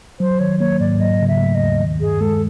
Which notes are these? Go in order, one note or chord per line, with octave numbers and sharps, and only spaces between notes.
F#3 C5
D#3 C#5
A#3 C#5
G#2 D5
F#3 D#5
C#3
E5
A3
D#5
D#2
D#3
G2 G#4
G#3 A4